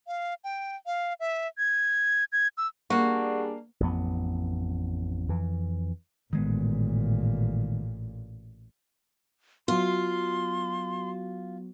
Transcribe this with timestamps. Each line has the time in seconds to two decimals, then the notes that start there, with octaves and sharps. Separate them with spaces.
0.07 F5
0.44 G5
0.86 F5
1.20 E5
1.58 G#6
2.32 G#6
2.58 E6
2.90 G3 A#3 D4 F#4 G#4
3.80 A1 F2 B3
5.29 F2 E3
6.33 A1 A#2 D#3 G#3 B3
9.68 F#3 B3 F4 F#4 C6